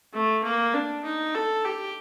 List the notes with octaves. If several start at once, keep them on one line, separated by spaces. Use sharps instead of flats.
A3
A#3
D4
D#4
A4
G4